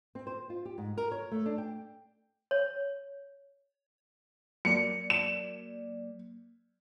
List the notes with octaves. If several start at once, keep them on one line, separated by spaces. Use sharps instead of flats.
C4
C5
F4
G4
G#2
A#4
C#5
A3
D4
G5
C#5
F#3 A#3 D5 C#7
E7